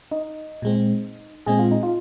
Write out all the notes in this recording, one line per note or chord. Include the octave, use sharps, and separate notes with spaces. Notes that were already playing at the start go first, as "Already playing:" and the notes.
D#4
A#2 G#3 C4
A#2 G#3 C4 G#4
F4
D#4
F4